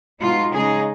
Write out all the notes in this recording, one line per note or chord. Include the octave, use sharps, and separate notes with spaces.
B2 G#3 D#4 F4
C#3 G#3 D#4 G#4